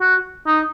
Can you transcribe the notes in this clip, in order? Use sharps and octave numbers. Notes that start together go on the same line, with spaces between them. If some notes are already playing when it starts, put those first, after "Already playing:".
F#4
D#4